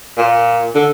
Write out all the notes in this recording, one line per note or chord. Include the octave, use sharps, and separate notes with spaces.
A#2
D3